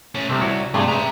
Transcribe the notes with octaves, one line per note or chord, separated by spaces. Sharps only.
A3 C#4
C2 C3 A3 C4
E4 F#4 C#5
G2 C3 A3 G#4
G#3 B4 D5 E5 A#5